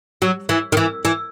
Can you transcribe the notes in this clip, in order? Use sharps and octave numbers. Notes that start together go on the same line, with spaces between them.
F#3
E3
D#3
E3
E3